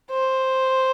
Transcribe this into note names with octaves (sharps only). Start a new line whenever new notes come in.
C5